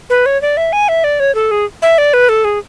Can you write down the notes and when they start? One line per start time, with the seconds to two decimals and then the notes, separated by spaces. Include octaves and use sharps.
0.10 B4
0.26 C#5
0.42 D5
0.57 E5
0.73 G#5
0.88 E5
1.04 D5
1.20 C#5
1.35 A4
1.51 G#4
1.82 E5
1.98 D5
2.13 B4
2.29 A4
2.44 G#4